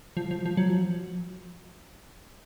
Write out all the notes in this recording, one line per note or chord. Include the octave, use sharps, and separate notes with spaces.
F3
F3
F3
F#3
F3